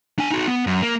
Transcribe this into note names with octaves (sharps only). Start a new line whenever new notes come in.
D4 G#5
D#4 F#4
B3
F#2
A#3